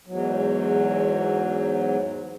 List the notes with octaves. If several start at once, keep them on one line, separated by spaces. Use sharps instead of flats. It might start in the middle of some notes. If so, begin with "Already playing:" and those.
E2 G#2 F#3